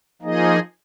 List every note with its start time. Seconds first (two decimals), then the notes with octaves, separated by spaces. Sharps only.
0.22 F3 A#3 D#4 G#4 D#5